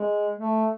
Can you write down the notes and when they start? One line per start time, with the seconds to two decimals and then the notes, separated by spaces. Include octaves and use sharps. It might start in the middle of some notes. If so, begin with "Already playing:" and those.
Already playing: G#3
0.38 A3